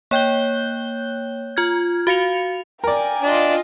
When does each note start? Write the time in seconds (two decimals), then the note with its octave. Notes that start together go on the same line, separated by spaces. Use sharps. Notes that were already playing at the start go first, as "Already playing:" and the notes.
0.11 A#3 C#5 G5 F#6 G6 G7
1.57 F4 F6 G#6
2.07 F#4 F5 C#7 F7
2.84 A#4 D5 G5 G#5
3.22 D4 F4 D#5